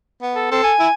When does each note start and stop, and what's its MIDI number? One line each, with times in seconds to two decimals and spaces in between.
0.22 0.50 59
0.35 0.48 69
0.51 0.60 60
0.51 0.73 69
0.64 0.94 80
0.79 0.88 64